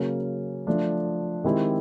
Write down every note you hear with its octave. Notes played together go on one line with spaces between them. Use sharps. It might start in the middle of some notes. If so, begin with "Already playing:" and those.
Already playing: C#3 F#3 A#3 C#4
F3 A3 D4
D#3 G#3 C4 E4 G4